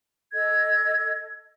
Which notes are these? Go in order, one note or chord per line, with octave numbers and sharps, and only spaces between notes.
A4 D#5 G#6